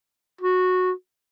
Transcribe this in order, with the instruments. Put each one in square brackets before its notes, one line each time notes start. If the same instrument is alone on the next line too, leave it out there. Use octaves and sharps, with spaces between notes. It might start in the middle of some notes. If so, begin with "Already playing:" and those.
[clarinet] F#4